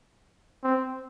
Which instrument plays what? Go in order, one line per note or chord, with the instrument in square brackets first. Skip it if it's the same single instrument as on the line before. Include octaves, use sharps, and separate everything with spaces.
[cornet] C4